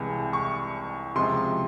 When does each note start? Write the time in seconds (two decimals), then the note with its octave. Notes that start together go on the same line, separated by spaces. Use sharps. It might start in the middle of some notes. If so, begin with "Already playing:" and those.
Already playing: C2 C3 E3 G#3
0.33 C#6
1.15 C#2 C3 F3 G#3 C6